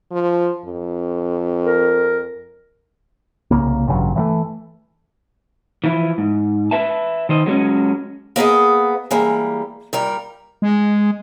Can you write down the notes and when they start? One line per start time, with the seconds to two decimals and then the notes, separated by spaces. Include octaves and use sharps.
0.12 F3
0.65 F2
1.66 A#4
3.51 C2 C#3 A#3
3.87 A1 G2 C#3 F#3
4.16 E3 F#3 A3
5.84 E3 F3 E4
6.18 G#2
6.71 B4 E5 A5
7.29 D#3 C5 D#5
7.46 F#3 G#3 B3 C#4
8.36 A#3 B3 G#4 D#5
9.11 E3 G3 G#3 A#3
9.93 A#2 G3 A#4
10.62 G#3